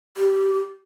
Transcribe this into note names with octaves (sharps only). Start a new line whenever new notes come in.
G4